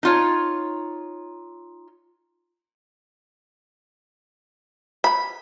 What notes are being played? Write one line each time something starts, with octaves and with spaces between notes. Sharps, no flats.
D#4 F4 C#5
B5